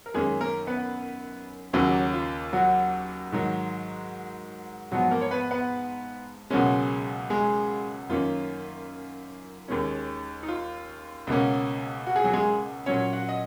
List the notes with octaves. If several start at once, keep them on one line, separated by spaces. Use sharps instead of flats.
A#4
F#2 D#3 G#3 A#3 C#4 G#4
A#3 A#4
B3 B4
D#2 C#3 F#3 A#3 C#4 F#4
F4
F#3 F#4
G#2 D#3 F#3
G#2 F3 F#3 B3 F#4
A#3 A#4
C#5
B3 B4
B3 B4
C#2 B2 F#3 G#3 A#3 C#4 G#4
G#3 G#4
F#2 D#3 A#3 C#4 F4
D#2 D#3 G#3 C#4
D#4
F4
C#2 B2 A#3 C#4
F#4
G#4
F#3 F#4
G#3 G#4
A#2 F#3 C#4 C#5
F#4 F#5
D#5